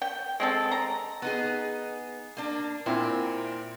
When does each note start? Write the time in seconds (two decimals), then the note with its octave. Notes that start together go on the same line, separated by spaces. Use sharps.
0.02 G5
0.40 G#3 C4 A4
0.71 A#5
1.22 B3 D#4 G#4
2.37 A#3 D4
2.86 A#2 C4 E4 A#4